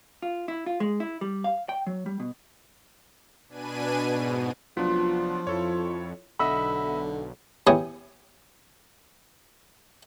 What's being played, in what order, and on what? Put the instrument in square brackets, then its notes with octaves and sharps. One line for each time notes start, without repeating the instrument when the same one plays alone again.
[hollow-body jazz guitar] F4
E4
F4
G#3
E4
G3
F5
G5
F#3
G3
B2
[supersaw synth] B2 D4 B4 G#5 D#7
G#2 B2
[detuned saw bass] F1 [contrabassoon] F3 [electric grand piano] F#3 B3 D4 [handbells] F4
[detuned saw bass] F2 [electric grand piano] E4 A4 C#5
[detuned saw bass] B1 [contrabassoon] D3 [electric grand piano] D#5 E5 F#5 [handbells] B5 E6
[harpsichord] B3 E4 G4 C#5 G#5 D#6